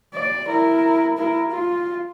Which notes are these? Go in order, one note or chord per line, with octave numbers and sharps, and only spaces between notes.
D5
E4 A#4
E4 A#4
F4